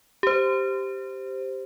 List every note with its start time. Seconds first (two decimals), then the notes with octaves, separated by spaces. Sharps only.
0.23 G4 C5